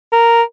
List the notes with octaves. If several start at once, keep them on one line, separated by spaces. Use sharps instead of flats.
A#4